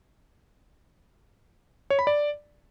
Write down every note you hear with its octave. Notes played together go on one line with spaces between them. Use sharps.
C#5
B5
D5